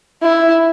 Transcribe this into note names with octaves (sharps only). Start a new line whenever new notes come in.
E4